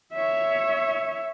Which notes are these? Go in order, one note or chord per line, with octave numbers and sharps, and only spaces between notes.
C#5 E5